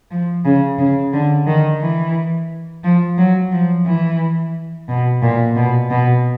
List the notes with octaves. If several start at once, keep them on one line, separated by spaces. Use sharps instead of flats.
F3
C#3
C#3
D3
D#3
E3
F3
F#3
F3
E3
B2
A#2
B2
B2